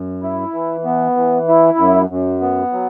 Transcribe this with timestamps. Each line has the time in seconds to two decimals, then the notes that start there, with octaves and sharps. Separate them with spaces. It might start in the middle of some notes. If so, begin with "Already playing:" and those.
Already playing: F#2
0.23 E4
0.54 E3
0.85 B3
1.16 E3
1.48 E4
1.78 F#2
2.10 F#2
2.41 B3
2.73 F#3